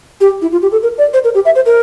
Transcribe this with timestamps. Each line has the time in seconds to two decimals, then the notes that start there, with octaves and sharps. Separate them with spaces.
0.21 G4
0.42 E4
0.52 F4
0.62 G4
0.72 A4
0.83 A#4
0.98 D5
1.14 C5
1.24 A#4
1.35 G4
1.45 E5
1.55 C5
1.66 A#4